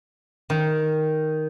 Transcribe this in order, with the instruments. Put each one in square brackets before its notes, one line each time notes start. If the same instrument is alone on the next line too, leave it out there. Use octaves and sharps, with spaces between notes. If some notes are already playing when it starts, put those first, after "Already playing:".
[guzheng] D#3